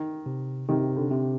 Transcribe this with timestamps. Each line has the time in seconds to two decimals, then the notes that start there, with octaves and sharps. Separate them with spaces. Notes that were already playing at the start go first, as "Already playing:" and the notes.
Already playing: D#3
0.26 C3
0.69 C3 D#3
0.96 D3
1.11 C3